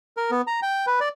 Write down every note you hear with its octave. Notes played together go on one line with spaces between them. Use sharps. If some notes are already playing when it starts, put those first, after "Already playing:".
A#4
B3
A#5
G5
B4
D5